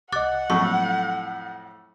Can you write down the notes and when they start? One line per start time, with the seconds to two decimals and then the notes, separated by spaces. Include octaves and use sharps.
0.12 C2 D#5 F#5 D6 F#6 A6
0.50 F2 A2 F#3 C#6